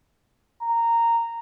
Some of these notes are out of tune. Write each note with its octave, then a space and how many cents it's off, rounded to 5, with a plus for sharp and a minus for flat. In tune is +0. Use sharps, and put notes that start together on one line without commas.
A#5 -10